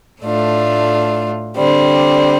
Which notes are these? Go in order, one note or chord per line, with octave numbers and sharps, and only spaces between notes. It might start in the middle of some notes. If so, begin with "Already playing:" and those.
A2 A3 D4 F4
D3 G3 C4